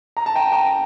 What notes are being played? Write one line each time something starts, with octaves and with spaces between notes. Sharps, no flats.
A#5
A5
G5 A#5
G5 A#5